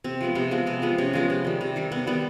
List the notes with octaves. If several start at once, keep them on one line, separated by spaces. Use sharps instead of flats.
C3 C4
F3 G#3 B3
C3 B3
F3 G#3 B3
C3 C4
F3 G#3 B3
C3 C#4
F3 G#3 B3
C3
D#3 G3
C3
D#3 G3
C3 B3
D#3 G3 B3